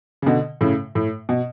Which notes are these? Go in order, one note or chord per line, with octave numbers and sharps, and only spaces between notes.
C#3
B2 D3
A2 C#3
A2
B2